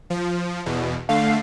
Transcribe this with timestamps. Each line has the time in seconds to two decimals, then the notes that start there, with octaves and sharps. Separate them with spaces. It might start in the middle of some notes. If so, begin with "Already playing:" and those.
0.10 F3
0.66 E2 B2
1.09 D3 A3 F5